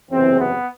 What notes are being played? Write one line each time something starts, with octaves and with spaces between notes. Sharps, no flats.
F#1 E2 C3 E3 C4
B3